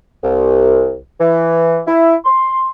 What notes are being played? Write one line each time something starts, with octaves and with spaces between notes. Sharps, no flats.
C2
E3
E4
C6